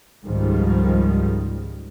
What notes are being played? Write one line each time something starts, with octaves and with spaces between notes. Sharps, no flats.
C#2 G#2 D#3 F3 G3